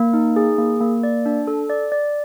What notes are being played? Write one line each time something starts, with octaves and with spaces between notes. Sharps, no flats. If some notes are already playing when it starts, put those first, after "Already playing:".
Already playing: A#3
D#4
G#4
A#3
A#3
D5
D4
A4
D5
D5